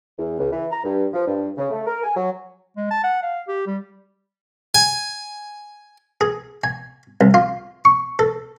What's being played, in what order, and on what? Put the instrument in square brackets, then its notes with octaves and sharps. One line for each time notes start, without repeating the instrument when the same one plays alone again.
[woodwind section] E2
C#2
E3
A#5
G2
F3
G2
C#3
A3
A#4
G#5
F#3
[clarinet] G#3
A5
F#5
F5
G4
G3
[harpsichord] G#5
G#4
G#5
C2
F4
C#6
A4